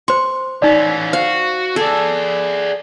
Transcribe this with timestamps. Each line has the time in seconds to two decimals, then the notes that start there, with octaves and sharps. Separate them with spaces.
0.08 C5 C6 C#6
0.62 E3 C#4 D#4 D5
1.13 F#4 C5 F5
1.76 G#4 A4 D5